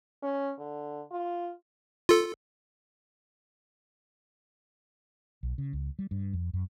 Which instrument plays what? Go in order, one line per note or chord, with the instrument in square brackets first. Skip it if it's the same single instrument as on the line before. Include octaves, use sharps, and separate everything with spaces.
[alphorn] C#4
D3
F4
[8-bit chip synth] F4 A4
[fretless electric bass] B1
C#3
C#2
G3
G2
F2
F#2